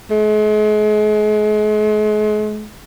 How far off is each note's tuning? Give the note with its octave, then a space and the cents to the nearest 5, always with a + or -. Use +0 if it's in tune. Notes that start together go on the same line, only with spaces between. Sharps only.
G#3 +40